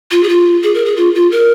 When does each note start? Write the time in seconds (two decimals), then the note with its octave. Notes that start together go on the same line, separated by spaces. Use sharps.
0.11 F4
0.23 G#4
0.29 F4
0.63 G#4
0.75 A#4
0.85 G#4
0.97 F4
1.15 F4
1.32 A#4